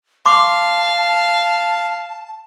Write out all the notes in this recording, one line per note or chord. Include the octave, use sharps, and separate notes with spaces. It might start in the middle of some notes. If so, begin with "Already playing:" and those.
F5 A5 C6 D6